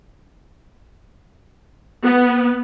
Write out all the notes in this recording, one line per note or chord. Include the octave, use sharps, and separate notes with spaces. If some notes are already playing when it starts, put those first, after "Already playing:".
B3